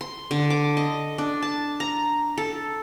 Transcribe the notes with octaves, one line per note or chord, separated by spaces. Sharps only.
C6
D3
D6
D#5
D4
A5
A#5
A4